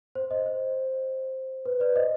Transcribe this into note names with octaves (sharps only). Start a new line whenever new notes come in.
C5
C5 D#5
C5
B4
B4 D5
C5 D#5